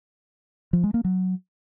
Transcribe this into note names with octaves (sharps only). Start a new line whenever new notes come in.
F3
G#3
A#3
F#3